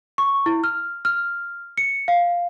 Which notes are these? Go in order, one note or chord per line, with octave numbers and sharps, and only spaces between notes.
C#6
E4
F6
F6
C#7
F5